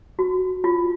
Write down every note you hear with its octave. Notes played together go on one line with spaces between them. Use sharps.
F#4
F4